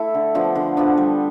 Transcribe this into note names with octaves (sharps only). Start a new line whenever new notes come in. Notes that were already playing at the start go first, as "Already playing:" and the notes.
Already playing: A3 E4 A4 E5
D3
F3 B3 D4
D3
F3 B3 D4
G3